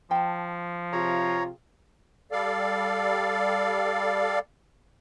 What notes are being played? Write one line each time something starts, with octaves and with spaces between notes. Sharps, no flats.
F3 G5 A5
C3 F4 G#4 C#5 A#5
G3 A4 D5 F5